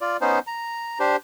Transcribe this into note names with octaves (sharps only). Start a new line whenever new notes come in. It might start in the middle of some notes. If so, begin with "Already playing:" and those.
F4 D5
B3 C#4 D#4 C5
A#5
D4 G4 C5